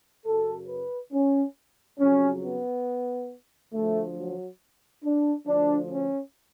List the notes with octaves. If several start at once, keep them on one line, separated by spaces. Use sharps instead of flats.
F#2 C#3 F#3 A4
B4
C#4
F2 C#3 F#3 C#4
B3
D2 D3 F3 A3
F#3
D4
D2 D3 F3 D4
C#4